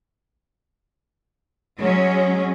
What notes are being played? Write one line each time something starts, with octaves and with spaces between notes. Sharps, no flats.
F#3 G#3 C#4